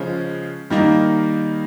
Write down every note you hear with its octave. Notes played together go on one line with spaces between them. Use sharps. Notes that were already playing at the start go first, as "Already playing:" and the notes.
Already playing: C#3 F3 G#3 C#4 F4
D#3 G3 A#3 D#4